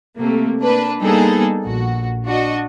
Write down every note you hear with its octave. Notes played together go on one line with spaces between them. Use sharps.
C3 A3 A#3
A#3 D4 B4
G3 A#3 B3 D#4 G#4 A4
A#1 F#4
D4 F#4 D#5